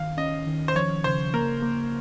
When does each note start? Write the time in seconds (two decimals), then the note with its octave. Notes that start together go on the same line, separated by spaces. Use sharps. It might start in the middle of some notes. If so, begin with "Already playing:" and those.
Already playing: D#3 F5
0.17 C#4 D#5
0.47 D#3
0.68 C5
0.75 F3 C#5
1.04 C#3 C5
1.34 A#3 A#4
1.63 A#3